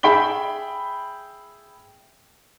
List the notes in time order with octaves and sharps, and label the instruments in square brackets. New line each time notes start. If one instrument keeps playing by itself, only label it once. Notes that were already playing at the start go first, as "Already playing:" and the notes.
[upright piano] G#4 E5 G5 B5 B6 G7